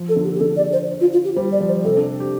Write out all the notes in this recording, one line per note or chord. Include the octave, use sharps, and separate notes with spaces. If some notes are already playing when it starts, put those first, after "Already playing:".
Already playing: F3
A4
D3
G4
G4
D3 A4
D5
C5
F4
F4
G4
G3 C5
D5
F3
C5
C3 A4
D4
G4